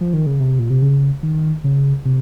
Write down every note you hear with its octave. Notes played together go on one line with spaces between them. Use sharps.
F3
D#3
C#3
C3
A#2
C3
C#3
D#3
C#3
C3